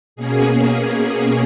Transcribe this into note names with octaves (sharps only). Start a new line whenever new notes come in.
B2 A#3 C#4 G#4